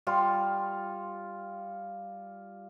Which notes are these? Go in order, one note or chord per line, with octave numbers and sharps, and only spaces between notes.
G3 F4 C6